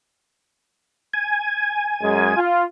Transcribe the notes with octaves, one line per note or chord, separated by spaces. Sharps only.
G#5
F#2 G#3
F4